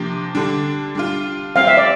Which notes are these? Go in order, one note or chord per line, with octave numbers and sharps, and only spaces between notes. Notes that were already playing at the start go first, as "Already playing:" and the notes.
Already playing: C3 F3 A#3 D4 G4
D3 G3 D4
G3 D4 F4
G3 C4 E4 G4 F5
E5
D5